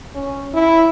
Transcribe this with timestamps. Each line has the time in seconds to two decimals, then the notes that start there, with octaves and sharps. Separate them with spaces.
0.15 C#4
0.54 E4